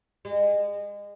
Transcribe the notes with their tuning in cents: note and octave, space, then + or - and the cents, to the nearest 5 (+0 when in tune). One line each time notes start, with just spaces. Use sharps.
G#3 -30